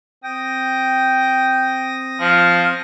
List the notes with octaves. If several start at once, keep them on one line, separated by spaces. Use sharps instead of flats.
C4 G5 D#6 A#6
F3 F6